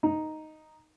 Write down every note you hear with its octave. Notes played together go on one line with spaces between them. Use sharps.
D#4